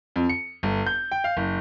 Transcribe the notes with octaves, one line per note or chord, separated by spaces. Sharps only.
F2
C#7
G1
G6
G5
F5
F#1